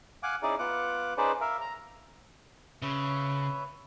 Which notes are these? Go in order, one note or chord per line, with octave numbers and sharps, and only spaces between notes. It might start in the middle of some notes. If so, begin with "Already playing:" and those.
F5 F#5 G#5 D6
C#4 D#4 E4 G#4 D5
B3 F4 F#5 D6
C#4 D#4 G#4 B4 C5 D5
A#4 E5 F5
A#5
C#3 B4 C#5 E5